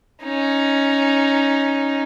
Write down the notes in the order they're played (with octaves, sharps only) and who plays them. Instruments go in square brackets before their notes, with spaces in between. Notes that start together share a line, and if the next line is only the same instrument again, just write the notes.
[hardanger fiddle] C#4 D#4